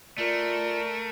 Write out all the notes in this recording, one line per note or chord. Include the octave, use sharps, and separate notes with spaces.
A3 F4 A#4 D5